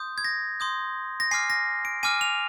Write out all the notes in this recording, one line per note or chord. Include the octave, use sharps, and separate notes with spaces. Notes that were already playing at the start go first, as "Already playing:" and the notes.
Already playing: C6 D#6 G6
G#6
A#6
C6 D#6 G6
A#6
G#5 D6 F6 C7
A#6
D7
G#5 D6 F6 D#7
F7